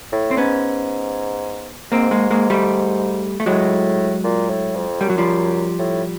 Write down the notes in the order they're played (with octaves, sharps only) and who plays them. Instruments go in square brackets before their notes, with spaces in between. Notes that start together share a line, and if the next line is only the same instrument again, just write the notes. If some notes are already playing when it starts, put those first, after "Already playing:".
[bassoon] A2
[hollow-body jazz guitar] C4
[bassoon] G#2 [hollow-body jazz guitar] B3 C#4
[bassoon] G#2 [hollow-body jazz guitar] A#3 C4
[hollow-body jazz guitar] G#3 A#3
G#3 A#3
G3 A3
A3
[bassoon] A2 [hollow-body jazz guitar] F#3 G#3
[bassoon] A#2
A2
F2
[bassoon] F#2 [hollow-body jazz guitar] G3
[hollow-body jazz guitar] F#3
F3 G3
[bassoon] A2